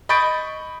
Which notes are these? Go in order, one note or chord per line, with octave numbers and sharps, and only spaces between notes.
D#5 B5 C#6 G6 A6 D7